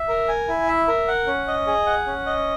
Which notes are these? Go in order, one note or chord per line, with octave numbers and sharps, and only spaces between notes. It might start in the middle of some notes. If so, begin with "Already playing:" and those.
Already playing: E5
A#4
G#5
E4
E5
A#4
F#5
C#4
D#5
G#4
F#5
C#4
D#5